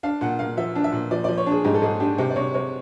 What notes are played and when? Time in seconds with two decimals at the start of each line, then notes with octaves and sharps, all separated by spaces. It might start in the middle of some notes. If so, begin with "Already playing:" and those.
0.03 D4 F5
0.21 A#2 F#5
0.39 A#2 F5
0.57 F3 E5
0.75 D4
0.84 E5
0.92 A#2
1.11 F3 D5
1.24 F3 D5
1.37 C#5
1.46 D4 G#4
1.64 G#2 G4
1.74 A4
1.82 G#2 G#4
2.00 D4 G4
2.18 C3 G4
2.30 D5
2.36 C3 C#5
2.54 C3 C#5